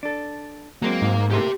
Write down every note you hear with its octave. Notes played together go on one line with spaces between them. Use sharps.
D4 A4
F#3 G#3 A#3 C4
G#2
A2 A3 A#3 G4 C6